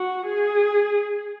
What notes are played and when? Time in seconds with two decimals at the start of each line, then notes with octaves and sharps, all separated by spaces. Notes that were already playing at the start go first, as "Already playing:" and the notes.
Already playing: F#4
0.26 G#4